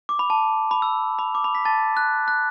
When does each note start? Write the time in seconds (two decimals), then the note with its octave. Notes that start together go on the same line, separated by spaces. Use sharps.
0.09 D6
0.19 B5
0.30 A5
0.71 B5
0.82 E6
1.19 B5
1.35 D6
1.44 B5
1.55 B5 B6
1.65 A5 A6
1.97 F#6
2.28 F#6